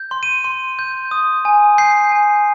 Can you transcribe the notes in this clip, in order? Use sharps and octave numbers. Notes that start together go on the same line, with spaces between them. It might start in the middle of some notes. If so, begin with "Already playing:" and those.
Already playing: G6
C6
D#7
C6
G6
D#6
G#5
G6 C7
G#5